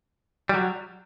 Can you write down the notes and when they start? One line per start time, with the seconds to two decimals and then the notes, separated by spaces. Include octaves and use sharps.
0.49 G3
0.54 F#3